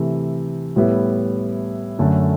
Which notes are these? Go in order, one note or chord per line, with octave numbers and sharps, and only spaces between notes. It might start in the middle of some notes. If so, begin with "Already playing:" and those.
Already playing: C3 E3 A3
A2 G3 B3 E4
F#2 D3 A3